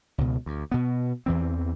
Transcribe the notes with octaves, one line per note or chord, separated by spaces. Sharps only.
C#2 B2
D2
B2 B3
E2 E3 C4